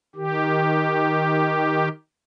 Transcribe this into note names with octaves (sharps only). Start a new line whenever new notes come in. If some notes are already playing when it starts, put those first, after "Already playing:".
D#3 G4